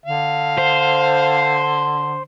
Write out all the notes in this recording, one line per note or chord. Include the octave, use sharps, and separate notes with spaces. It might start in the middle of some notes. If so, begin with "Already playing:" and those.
D3 F5
C5